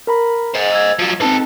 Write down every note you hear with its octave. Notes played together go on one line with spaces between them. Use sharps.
A#4 A#5 B5
C5 D#5
E6 G#6
F3 F#3
G#2 C4 D#4 A4 B4